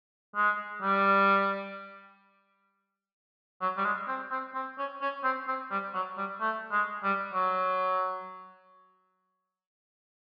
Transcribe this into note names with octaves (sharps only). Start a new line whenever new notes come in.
G#3
G3
F#3
G3
G#3
C4
C4
C4
C#4
C#4
C4
C4
G3
F#3
G3
A3
G#3
G3
F#3